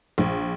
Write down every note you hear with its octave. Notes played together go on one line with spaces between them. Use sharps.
A#1